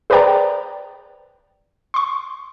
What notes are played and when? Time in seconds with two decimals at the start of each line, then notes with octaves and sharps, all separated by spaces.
0.10 G#4 B4 C5 D5 G5 A#5
1.94 C6 C#6